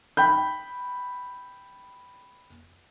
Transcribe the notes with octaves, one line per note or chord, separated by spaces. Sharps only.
G5 B5 G6